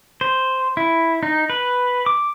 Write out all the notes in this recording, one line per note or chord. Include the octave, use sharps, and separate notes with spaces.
C5
E4
D#4
B4
D6